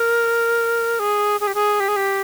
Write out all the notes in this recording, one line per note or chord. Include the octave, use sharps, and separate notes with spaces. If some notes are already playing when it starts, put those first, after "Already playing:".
Already playing: A#4
G#4
G#4
G4
G#4
G4
G#4
G4